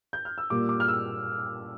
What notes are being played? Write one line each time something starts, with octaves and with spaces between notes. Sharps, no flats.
G6
F6
E6
A#2 G3 A#3 D6
D6
F6
E6